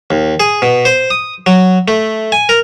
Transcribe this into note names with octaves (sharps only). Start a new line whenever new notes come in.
D#2
G#4
B2
C5
D#6
F#3
A3
G#5
A#4